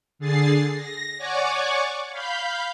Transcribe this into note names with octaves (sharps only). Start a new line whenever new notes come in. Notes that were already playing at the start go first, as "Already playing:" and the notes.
D3 G#4 A6 C7
A#6
C#5 D5 F#5 G#5 C#6 D6
F5 B5 G6